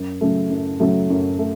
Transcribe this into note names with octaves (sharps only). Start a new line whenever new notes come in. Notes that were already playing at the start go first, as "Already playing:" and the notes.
Already playing: F#2
C#3 F#3 A3
F#2
C#3 F#3 A3
F#2
A3